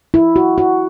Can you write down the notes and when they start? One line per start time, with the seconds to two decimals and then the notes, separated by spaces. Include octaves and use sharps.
0.14 E4
0.36 F#4
0.58 F#4